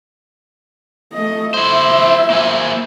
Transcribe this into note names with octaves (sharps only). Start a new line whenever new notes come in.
A3 D#5
E4 C5 E5
A#3 C5 G#5